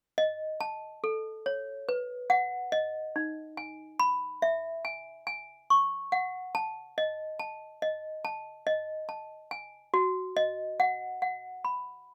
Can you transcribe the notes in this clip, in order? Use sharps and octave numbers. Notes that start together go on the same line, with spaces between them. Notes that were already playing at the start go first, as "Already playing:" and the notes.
D#5
A5
A4
C#5
B4
F#5
D#5
D#4
G#5
B5
E5
G#5
G#5
C#6
F#5
A5
D#5
A5
D#5
A5
D#5
A5
G#5
F#4
D#5
F#5
F#5
B5